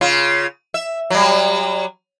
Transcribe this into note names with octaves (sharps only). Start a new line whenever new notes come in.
C#3 F4
E5
F#3 G3